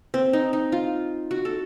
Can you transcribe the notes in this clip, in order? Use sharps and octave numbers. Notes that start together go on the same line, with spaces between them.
C4
D#4
D#4
F4
F#4
A4